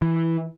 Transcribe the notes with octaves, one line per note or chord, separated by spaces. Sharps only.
E3